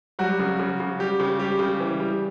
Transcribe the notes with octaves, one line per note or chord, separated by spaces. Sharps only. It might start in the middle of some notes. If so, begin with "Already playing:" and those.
F#3 G3 F#4
C#3
C#3
C#3
G3 G4
C#3
G3 G4
C#3
E3
G3